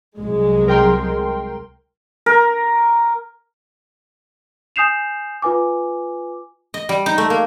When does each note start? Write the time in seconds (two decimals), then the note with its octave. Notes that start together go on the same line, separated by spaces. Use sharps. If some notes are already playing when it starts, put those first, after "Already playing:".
0.17 C2 F#3 G#3
0.68 A#4 G5 C6
2.26 A#4
4.76 G#5 D#6 G6 C7 E7 F7
5.42 F4 B4 G#5 D6
6.74 D#5
6.89 G3
7.06 D#4
7.18 A3
7.30 A#3